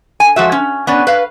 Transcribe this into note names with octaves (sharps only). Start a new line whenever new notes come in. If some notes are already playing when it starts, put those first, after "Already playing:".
G#5
F3 G#3 F#4 E5
C#4
B3 C#4 D5
B4 F5